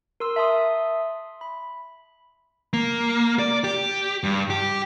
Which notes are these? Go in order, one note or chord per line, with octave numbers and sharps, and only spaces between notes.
A#4 C6 E6
E5 A5 C6 D#6
B5
A#3
D5
G4
G2
G4